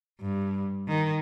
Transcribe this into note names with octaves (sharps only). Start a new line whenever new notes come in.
G2
D#3